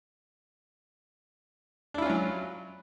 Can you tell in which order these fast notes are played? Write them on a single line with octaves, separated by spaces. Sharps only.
D4 E4 F4 C#4 F#3